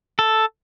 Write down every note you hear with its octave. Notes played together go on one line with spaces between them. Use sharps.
A4